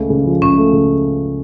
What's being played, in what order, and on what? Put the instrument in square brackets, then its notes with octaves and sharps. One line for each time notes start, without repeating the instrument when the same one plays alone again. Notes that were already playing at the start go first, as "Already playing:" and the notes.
Already playing: [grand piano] C#2 A3
C#3
F3
[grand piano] C#2 [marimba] C#4
[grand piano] A3
C#3